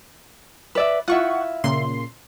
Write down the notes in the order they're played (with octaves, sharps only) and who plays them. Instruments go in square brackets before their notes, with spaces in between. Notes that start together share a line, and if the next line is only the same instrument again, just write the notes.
[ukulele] B4 D5 E5
[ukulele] E4 F4 [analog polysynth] F#5 C#6
[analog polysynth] A#2 C#3 C6